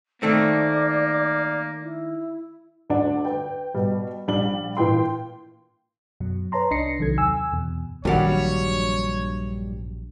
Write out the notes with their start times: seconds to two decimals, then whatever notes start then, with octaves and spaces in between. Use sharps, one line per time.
0.22 D#3 A3 A#3 C4 D5
1.82 E4
2.90 D2 D4 F#5
3.25 B4 G5
3.74 B2 G3
4.28 A#1 G3 D4 F#7
4.77 A#2 E3 G5 C6
6.20 F#2 B2 F#3
6.52 B4 C#5 A5 A#5 C6
6.71 C2 D4 D#5 A#6 C7 C#7
6.99 B1 C3 D#3 F#3 A4 G#6
7.18 D#2 G#5 E6
7.52 E2 B2
8.05 A#1 G2 D#3 F#3 G3 C#5 F#5